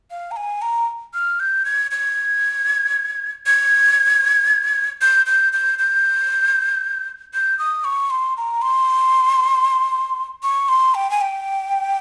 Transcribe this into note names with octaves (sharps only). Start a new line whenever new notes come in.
F5
A#5
G#5
A#5
F6
G6
G#6
G#6
G#6
G6
G6
G6
G6
G6
D#6
C#6
C6
A#5
C6
C#6
C6
G5
G#5
G5